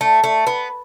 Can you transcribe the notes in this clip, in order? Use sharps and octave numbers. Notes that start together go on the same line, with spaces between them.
A3
A3
B3